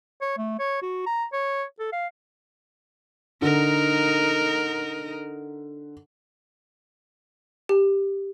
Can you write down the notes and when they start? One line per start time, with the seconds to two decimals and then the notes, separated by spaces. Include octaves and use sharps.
0.22 C#5
0.38 A3
0.59 C#5
0.82 F#4
1.06 A#5
1.33 C#5
1.79 A4
1.93 F5
3.42 D3 D#4 A#4
7.69 G4